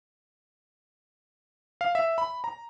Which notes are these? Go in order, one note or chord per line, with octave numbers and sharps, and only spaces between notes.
F5
E5
B5
A#5